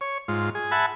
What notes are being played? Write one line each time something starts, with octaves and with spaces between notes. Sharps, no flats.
C#5
G#2 F4
G#4
E5 F#5 G#5 A5 B5